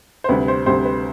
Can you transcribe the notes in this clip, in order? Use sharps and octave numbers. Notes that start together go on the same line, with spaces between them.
C5
D2 C3 G3 B4
C5
D2 C3 G3 C5
B4